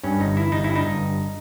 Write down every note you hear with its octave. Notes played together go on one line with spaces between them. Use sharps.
G2 C#4
G1 D#4
E3 E4
G1 D#4
G2 E4
D#4
G1
G2